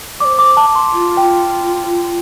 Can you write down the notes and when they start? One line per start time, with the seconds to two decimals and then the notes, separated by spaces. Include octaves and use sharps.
0.20 D5 D6
0.25 C5
0.39 D6
0.57 A5
0.75 C6
0.93 F4
1.17 G5